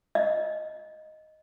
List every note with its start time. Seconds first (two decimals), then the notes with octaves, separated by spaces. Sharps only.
0.15 D#5